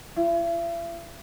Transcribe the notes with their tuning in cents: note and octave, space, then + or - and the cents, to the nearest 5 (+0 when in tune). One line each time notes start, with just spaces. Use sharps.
E4 +45